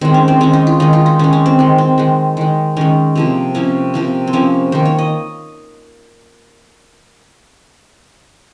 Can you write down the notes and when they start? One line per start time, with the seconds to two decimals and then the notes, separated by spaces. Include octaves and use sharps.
0.01 D#3 G#3 C4
0.14 C#4
0.28 C4
0.41 D#3 G#3 C#4
0.53 D#4
0.67 F4
0.80 D#3 G#3 D#4
0.93 F4
1.06 D#4
1.19 D#3 G#3 C#4
1.33 C#4
1.46 C4
1.59 D#3 G#3
1.78 C4
1.98 D#3 G#3
2.37 D#3 G#3
2.77 D#3 G#3 C#4
3.15 C3 F3 A#3
3.54 C3 F3 A#3 C#4
3.94 C3 F3 A#3
4.27 C4
4.33 C3 F3 A#3 C#4
4.72 D#3 A#3 C5
4.85 C#5
4.99 D#5